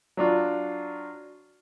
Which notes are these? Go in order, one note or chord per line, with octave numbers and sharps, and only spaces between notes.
F#3 D4 F4